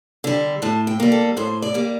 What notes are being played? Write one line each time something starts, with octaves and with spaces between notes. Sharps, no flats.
D3 G3
A2 A5
G5
G3 A#3
A4
A2 C5
D5
G3 A#3